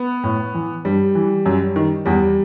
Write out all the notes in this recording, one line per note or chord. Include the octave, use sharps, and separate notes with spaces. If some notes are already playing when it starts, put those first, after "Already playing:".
Already playing: B3
A2
E3
G2 G3
E3
F#2
D#3
E2 G3